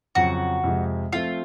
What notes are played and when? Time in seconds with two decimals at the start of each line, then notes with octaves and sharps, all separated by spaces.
0.15 F2 C#3 F#3 F#4
0.64 F2 C3 F3 G#3
1.12 F3 A3 C4 F4